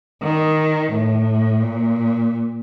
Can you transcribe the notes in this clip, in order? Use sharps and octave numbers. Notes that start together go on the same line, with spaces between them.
D#3
A2
A#2